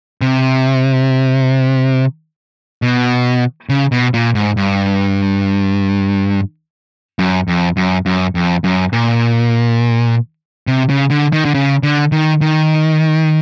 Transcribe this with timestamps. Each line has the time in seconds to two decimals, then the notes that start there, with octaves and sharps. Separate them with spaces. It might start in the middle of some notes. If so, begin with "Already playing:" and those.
0.21 C3
2.82 B2
3.69 C#3
3.92 B2
4.14 A#2
4.35 G#2
4.57 G2
7.19 F#2
7.48 F2
7.77 F#2
8.06 F#2
8.35 F2
8.64 F#2
8.93 A#2
10.67 C3
10.89 C#3
11.11 D3
11.33 D#3
11.45 D3
11.54 C#3
11.83 D3
12.12 D#3
12.41 D#3